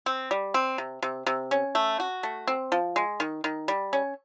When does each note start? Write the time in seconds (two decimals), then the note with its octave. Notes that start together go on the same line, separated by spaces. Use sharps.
0.06 C4
0.31 G3
0.54 C4
0.78 C3
1.02 C3
1.26 C3
1.51 C#4
1.75 A3
2.00 F#4
2.23 A3
2.47 C4
2.72 F3
2.96 G#3
3.20 D#3
3.44 D#3
3.68 G3
3.93 C#4